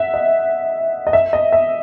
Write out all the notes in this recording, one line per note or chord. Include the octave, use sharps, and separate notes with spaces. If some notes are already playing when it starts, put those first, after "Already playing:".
Already playing: E5 F#5
D#5
D#5
E5
D#5
E5